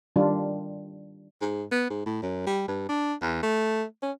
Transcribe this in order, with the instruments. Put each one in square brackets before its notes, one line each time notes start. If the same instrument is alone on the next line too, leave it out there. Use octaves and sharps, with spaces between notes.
[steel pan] D#3 G3 D4 F4
[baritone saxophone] G#2
B3
G#2
A2
F#2
G3
G2
D4
E2
A3
C#4